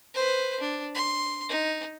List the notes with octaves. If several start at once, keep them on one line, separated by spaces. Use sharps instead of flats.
B4 C5
D4
C6
D#4